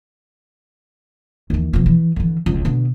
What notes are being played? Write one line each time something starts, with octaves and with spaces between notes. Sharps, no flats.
D#2 E3
B2 F3
E3
D3 E3
E1 C#2
B2 D3